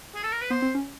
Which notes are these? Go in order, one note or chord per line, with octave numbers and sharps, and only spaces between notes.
G#4
A4
A#4
B4
B3 C5
C4
C#4